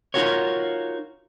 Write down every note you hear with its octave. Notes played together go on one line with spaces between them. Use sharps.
D#4 F4 F#4 A#4 C#5